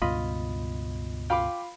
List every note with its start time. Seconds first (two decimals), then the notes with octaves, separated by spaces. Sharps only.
0.02 C#2 G2 B2 F4 D#5 B5
1.30 F4 F5 G5 B5 D6